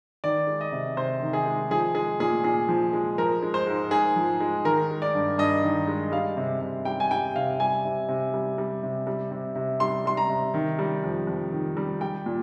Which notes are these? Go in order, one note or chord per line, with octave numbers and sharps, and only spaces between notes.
D#3 D5
G#3
D#5
C3
C3 C5
D#3
G#4
G#3
F3 G#4
G#3 G#4
A#2 G#4
A#2 G#4
F3
G#3
F3 A#4
G#3
C5
G#2
G#2 G#4
F3
G#3
D#3 A#4
G#3
D5
G2
G2 D#5
D#3
G#3
G3 F5
C3
C3
G3 G5
G#5
G3 G5
C3 F5
G3 G#5
C3
C3
G3
G3
C3
G3
C3
C3
G3 C6
G3 C6
A#5
C3
D#3
G3
F2
F2
D#3
G3
G3 G5
A#2